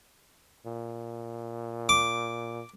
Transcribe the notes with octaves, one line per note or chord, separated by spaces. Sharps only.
A#2
D6